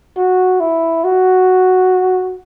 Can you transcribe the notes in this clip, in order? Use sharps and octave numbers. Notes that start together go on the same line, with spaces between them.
F#4
E4
F#4